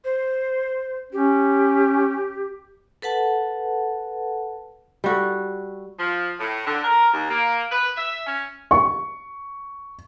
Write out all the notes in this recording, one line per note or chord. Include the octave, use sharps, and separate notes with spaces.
C5
C#4 G4
A4 B4 F#5 A5
G3 F#4 A4
F3
A2
D3
A#4
D#2
A#3
B4
E5
C#4
C#6